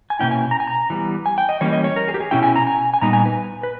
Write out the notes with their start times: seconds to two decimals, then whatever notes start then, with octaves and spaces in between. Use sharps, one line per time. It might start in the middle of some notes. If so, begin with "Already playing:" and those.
0.10 G#5
0.19 B2 G3 A#3 C#4 E4 G5
0.31 G#5
0.51 A#5
0.60 G#5
0.67 A#5
0.90 E3 G3 B3
1.26 G#5
1.38 G5
1.49 D#5
1.61 E3 G3 A#3 C#4 C#5
1.73 D#5
1.84 C#5
1.96 A#4
2.08 G#4
2.14 G4
2.20 G#4
2.31 B2 G#3 C#4 E4 G5
2.43 G#5
2.56 A#5
2.67 G#5
2.94 G#5
3.02 A#2 G3 B3 D#4 A#5
3.13 G#5
3.26 B4
3.63 B4